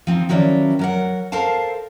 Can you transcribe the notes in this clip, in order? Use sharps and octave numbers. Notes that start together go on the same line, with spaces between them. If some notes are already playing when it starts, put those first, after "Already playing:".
F3 C4 D#4
D#3 F3 F#3 C#4 E4 D5
F#3 A#4 F#5
A4 A#4 C5 F5 A5